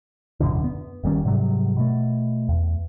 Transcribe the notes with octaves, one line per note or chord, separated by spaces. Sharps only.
D1 F#2 B2 D3
B3
F#1 D#3 G3 C#4
G#2 C3 F#3 G3
B2 A3
E2